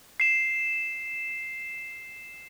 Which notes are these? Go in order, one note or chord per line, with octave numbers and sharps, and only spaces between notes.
C7 E7